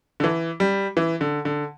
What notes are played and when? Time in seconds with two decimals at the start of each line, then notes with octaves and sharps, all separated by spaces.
0.20 D3
0.24 E3
0.60 G3
0.97 E3
1.21 D3
1.45 D3